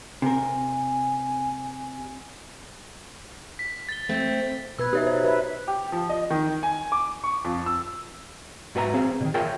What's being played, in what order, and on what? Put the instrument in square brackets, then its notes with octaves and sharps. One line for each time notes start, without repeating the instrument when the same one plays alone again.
[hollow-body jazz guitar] C3 A#4 [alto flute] G#5
[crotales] B6
A6 G7
[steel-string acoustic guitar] A3 C4
[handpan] B2 B4 [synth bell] E6 G#6
[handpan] D#4 [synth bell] G4 C#5 E5
[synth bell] C5
[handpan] B4 E5
[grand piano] G4
F3
D#5
D#3
G#5
D6
C#6
F2
E6
[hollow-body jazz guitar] G#2 F#4 B4 E5 A#5
C4 G#4 F5
B2 D#3
F4 G#4 A#4 C#5 E5 G5